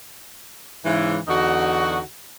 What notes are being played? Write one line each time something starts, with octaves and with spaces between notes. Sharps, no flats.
G#2 C#3 E3
E2 D3 D#4 F#4